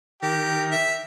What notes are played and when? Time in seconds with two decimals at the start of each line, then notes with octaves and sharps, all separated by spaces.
0.23 D#3 G4 A#4
0.72 E5